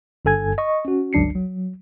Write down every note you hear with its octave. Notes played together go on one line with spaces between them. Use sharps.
G1 G2 A4 G#5 G#6
D#5 C#6
C#4 F#4
G1 C#2 F#3 D4 C7 C#7
F#3